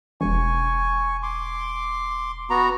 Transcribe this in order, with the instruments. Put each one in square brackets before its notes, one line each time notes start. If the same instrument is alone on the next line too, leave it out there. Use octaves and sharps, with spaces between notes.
[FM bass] E1 [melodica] G#5 C#6
[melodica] C6 D6
B3 F#4 A#5